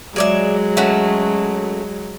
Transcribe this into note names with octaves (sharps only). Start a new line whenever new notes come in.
F#3 G#3 G#4 D5 E5
A3 C#4 F#4